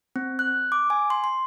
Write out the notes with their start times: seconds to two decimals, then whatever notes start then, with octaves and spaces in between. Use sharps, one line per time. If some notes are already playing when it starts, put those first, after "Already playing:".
0.16 C4
0.39 F#6
0.72 D6
0.90 G#5
1.10 C6
1.24 C6